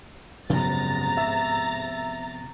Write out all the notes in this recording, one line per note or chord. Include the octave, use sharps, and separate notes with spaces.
F#1 G#2 C3 F3 B3 A#5 A6
E5